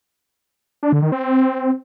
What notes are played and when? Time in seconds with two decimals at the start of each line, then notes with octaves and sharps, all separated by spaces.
0.83 D4
0.93 D3
1.02 D#3
1.12 C4